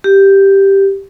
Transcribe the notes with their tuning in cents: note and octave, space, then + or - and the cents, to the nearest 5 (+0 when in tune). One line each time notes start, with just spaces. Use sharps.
G4 +0